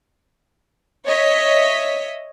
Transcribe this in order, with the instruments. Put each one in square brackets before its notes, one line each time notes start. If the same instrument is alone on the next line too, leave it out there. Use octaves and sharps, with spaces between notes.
[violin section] C#5 D#5 E5 B6